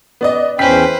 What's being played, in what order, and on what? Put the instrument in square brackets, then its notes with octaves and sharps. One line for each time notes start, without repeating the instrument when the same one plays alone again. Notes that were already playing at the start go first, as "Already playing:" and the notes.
[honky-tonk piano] B3 D5 D#5
[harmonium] E2 C#4 G5 [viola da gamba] B4 C5 [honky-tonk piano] B6